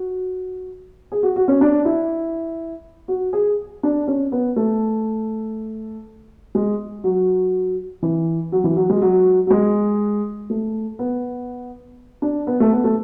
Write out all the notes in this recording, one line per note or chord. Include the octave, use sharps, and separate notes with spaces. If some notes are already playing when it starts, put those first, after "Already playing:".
Already playing: F#4
G#4
F#4
F#4
C#4
D4
E4
F#4
G#4
D4
C#4
B3
A3
G#3
F#3
E3
F#3
E3
F#3
G#3
F#3
F#3
G#3
A3
B3
D4
B3
A3
B3
A3